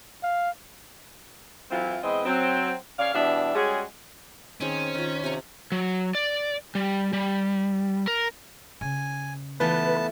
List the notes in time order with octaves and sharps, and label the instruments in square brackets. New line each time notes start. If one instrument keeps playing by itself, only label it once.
[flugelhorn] F5
[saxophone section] E3 F#3 A3 C4 E4 F4
E2 G#3 C4 B4 D#5
F#3 C4
C#3 C#5 D5 F5
B2 E3 G3 D4 E5
G3 G#3 C#4 F#4 G#4
[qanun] D#3 C4 G#4 [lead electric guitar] C#4
[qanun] D#3 F4
C3 A#5
[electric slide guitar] F#3
D5
G3
G3
A#4
[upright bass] C#3 [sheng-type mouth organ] G#5
[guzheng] E3 A3 F4 [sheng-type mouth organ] B3 A5 [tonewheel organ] B4